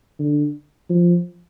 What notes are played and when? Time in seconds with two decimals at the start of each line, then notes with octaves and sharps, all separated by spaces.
0.19 D3
0.90 F3